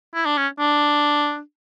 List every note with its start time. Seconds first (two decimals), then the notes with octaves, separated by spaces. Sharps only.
0.14 E4
0.26 D4
0.38 C#4
0.59 D4